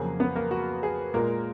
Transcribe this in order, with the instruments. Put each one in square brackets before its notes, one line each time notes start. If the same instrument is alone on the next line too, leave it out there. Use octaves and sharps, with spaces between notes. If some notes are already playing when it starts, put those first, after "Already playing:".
Already playing: [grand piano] F2 C#3 F#3 A#3 G#4
B3 B4
A#3 A#4
F#4
G#4
A#2 G#3 A#3 A#4